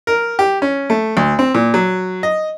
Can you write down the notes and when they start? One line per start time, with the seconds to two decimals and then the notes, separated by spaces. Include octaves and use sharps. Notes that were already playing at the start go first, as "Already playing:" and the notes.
0.07 A#4
0.39 G4
0.62 C#4
0.90 A3
1.17 D2
1.39 C4
1.54 A#2
1.74 F#3
2.23 D#5